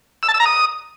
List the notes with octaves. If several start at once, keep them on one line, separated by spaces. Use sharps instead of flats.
E6
A5
E6
A#5
D#6